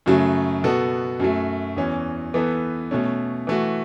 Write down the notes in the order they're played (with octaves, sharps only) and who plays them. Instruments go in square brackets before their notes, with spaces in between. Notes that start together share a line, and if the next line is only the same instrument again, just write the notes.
[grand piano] F#2 C#3 F#3 A3
B2 B3 F#4 A4
F#2 F#3 A3
E2 E3 C#4
E3 B3 A4
B2 A3 C#4
E3 A3 F#4